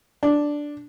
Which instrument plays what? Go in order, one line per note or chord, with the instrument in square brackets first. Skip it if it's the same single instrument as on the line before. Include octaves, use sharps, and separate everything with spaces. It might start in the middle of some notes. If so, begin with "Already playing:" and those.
[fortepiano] D4